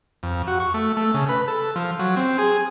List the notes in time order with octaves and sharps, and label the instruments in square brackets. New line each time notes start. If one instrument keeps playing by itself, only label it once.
[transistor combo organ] F2
F#4
C#6
A3
A3
C#3
B4
A4
F3
F#3
C4
G#4